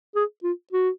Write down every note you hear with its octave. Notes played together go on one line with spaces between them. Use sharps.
G#4
F4
F#4